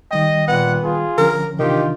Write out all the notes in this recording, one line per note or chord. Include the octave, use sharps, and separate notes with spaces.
D#3 G3 D#5 G5
A#2 B3 F#5
F4 G#4
D3 F3 C#4 A#4
C3 D#3 E3 D4 F4 G4